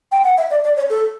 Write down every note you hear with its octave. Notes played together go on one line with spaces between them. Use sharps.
G5
F#5
E5
D5
D5
C#5
A4